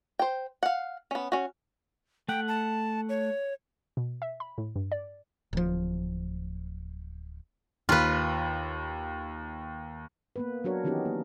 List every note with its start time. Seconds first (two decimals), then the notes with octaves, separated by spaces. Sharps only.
0.19 C5 G5
0.63 F5 F#5
1.11 B3 C#4
1.32 C#4 F#4
2.29 A3 F#5 G5
2.48 A5
3.09 C#5
3.97 B2
4.22 E5
4.40 B5
4.58 A2
4.76 G2
4.92 D5
5.53 D1 F3
7.89 D#2 F4 B4
10.36 A#3 B3 B4
10.64 F#3 D4 F#4 A#4 C#5
10.84 D#3 E3 B3 C#4 D#4 G4
11.05 A#3